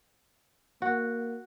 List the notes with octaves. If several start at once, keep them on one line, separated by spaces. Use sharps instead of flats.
A#3 F#4